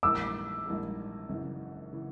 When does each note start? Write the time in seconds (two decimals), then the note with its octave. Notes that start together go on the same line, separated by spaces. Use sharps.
0.03 A#1 G#2 E3 G3 A#3 D6 E6
0.66 A#1 G#2 E3 G3 A#3
1.29 G#1 F#2 C#3 E3
1.93 C#3 E3